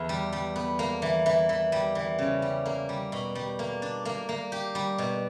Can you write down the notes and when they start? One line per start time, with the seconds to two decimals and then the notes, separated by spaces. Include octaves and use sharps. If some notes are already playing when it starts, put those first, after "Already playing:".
Already playing: E2 B3
0.09 G3
0.32 G3
0.56 B3
0.79 A#3
1.02 E3
1.26 E3
1.49 E3
1.72 G3
1.95 E3
2.19 C#3
2.42 G3
2.66 A#3
2.89 G3
3.12 B2
3.35 G3
3.59 A#3
3.82 D4
4.05 A#3
4.29 A#3
4.52 G4
4.75 G3
4.98 B2